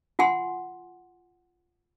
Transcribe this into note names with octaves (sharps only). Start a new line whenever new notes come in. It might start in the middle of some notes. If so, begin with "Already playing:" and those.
F4 F#5 G#5 C6